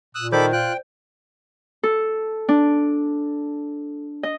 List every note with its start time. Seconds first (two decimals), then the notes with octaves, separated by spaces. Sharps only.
0.15 A#2 D#6 E6 F#6
0.32 D#3 A4 C5 D5 B5 D6 G6
0.53 F4 G5 F#6
1.83 A4
2.49 D4
4.23 D#5